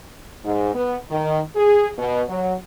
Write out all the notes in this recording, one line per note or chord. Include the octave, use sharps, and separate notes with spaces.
G#2
B3
D#3
G#4
B2
F#3